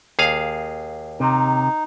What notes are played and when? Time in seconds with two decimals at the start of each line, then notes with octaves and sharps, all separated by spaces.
0.19 D#2 G#4 F5
1.20 C3 D#4